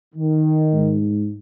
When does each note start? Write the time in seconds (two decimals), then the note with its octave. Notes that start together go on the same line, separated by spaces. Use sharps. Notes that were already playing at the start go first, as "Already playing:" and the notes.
0.15 D#3
0.74 G#2